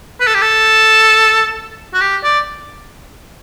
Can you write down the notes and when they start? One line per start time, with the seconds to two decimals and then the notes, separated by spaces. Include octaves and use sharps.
0.20 B4
0.27 A4
0.34 G4
0.42 A4
1.94 F#4
2.01 G4
2.24 D5